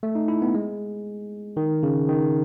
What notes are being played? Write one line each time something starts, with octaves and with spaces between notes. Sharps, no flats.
A3
D#4
E4
B3
G#3
D#3
C#3
D#3